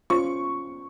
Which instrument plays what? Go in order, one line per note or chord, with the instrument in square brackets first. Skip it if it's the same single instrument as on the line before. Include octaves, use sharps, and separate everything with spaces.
[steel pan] C#4 F4 C5 [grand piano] C#6